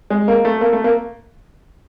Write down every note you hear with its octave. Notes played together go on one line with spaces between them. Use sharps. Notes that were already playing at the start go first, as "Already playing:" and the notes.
G#3
A#3
A3
A#3
A3
A#3